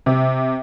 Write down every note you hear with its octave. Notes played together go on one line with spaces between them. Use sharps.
C3